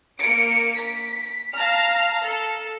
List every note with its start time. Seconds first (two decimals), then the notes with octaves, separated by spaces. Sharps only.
0.19 A#3 C#7 D7
0.75 B6
1.55 F5 A5 A#5 F6
2.24 A4